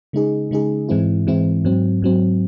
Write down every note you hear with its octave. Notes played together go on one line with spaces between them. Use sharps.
C#3 G#3 D#4 G#4
C#3 G#3 D#4 G#4
G#2 E3 G#3 C4 E4
G#2 E3 G#3 C4 E4
G#2 F#3 C4
G#2 F#3 C4